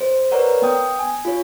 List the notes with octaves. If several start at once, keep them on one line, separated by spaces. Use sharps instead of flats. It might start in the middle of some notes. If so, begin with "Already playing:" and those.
C5
A#4 B4 C#5 D5 F#5 A#5
B3 G5 D#6
G#5
F4 C#5